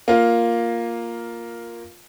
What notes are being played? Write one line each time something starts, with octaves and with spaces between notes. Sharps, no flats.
A#3 F4